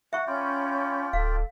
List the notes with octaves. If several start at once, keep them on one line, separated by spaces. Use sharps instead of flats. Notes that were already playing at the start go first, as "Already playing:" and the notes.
E5 F#5 C#6
C#4 F4 D5 G5 B5 G6
D1 A4 F5